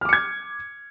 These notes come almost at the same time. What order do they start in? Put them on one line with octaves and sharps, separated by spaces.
F6 D6 C#7 G#6